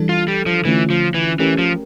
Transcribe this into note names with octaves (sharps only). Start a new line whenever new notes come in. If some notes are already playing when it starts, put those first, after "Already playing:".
Already playing: E3 G3 D4 A4
F4
G3
F3
D3 E3 A3 C#4 F4
F3
E3
E3 A3 C#4 G4 A#4
F3